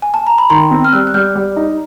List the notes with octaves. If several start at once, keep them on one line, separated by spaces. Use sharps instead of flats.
G#5
A5
A#5
B5
D#3 A#5 C6
C4
F6
G3 E6 F#6
F#6
G3 F6 G6
G3
D#4